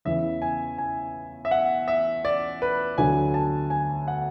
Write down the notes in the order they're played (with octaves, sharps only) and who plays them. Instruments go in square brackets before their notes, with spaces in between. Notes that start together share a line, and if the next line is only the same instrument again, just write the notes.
[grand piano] E2 C#3 E3 E5
G#5
G#5
E5
F#5
E5
D5
B4
D2 D3 F#3 G#5
A5
G#5
F#5